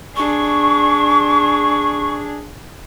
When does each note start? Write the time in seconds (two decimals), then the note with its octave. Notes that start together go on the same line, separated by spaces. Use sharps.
0.16 D4 G#4 C#6